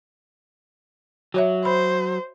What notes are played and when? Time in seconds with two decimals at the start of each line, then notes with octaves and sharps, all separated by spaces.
1.34 F#3 F#4 C#5 E5
1.65 C5 B5